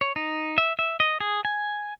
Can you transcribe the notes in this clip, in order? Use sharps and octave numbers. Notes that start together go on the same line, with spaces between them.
C#5
D#4
E5
E5
D#5
G#4
G#5